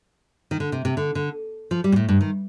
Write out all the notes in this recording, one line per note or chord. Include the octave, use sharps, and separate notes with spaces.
D#3
D3
C3
C3
D3
D3
F3
G3
A#2
A2
G2
D#3